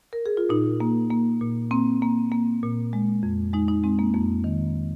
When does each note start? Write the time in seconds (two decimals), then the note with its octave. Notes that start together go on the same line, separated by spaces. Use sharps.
0.13 A#4
0.26 G#4
0.37 F4
0.49 A#2 D#4
0.80 A#3
1.11 A#3
1.41 A#2
1.71 A#3 C4
2.02 A#3
2.32 A#3
2.63 A#2
2.93 G#3
3.23 F2
3.53 G#3 D#4
3.68 D#4
3.84 G#3 C4
3.99 A#3
4.14 F2 A#3
4.44 D#3